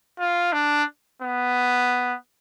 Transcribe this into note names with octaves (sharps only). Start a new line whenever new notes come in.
F4
D4
B3